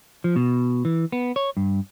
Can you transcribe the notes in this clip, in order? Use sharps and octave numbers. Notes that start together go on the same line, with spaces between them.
F3
B2
E3
B3
C#5
G2